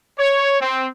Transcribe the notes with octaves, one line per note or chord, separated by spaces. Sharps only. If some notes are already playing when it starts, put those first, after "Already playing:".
C#5
C4